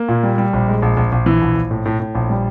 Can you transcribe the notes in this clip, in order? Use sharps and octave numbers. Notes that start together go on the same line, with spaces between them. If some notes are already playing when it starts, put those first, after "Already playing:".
Already playing: A#3
A#2
G3
G3
A#1
G#3
A#1
A#1
A#1
E3
A#1
A#1
A2
A2
A2
A#1
G3